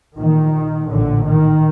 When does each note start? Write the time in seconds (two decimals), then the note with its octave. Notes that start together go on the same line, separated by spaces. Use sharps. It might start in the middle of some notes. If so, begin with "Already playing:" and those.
0.18 A#1 A#2 D#3
0.90 A#1 A2 D3
1.25 D#3